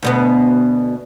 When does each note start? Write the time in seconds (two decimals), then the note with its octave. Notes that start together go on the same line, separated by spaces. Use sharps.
0.03 D2 B2 B3